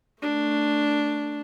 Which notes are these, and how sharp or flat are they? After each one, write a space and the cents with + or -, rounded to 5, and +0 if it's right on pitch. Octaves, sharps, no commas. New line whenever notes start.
A3 +10 D4 +0